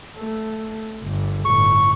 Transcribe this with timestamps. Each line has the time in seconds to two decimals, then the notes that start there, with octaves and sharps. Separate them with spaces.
0.18 A3
1.02 G1
1.45 G1 A2 C#6